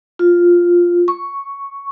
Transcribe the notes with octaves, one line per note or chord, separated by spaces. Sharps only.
F4
C#6